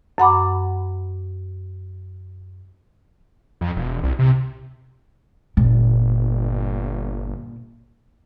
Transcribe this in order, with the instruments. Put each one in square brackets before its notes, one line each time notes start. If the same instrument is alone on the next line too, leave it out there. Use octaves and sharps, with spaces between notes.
[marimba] F#2 F#5 B5 D6
[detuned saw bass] F2
E1
C2
C3
[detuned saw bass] G1 [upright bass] A#2